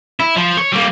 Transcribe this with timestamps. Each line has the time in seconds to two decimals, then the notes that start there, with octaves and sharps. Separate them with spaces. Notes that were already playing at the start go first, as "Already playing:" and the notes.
0.20 E4
0.36 F3
0.57 C#5
0.72 G3 A#3